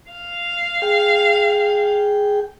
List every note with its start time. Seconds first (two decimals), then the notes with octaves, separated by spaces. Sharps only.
0.11 F5
0.82 G#4 G5